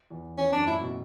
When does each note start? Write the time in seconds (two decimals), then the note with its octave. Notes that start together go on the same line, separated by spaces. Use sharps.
0.10 E2
0.38 E2 C#4
0.52 F#2 D4
0.67 A2 E4
0.80 B2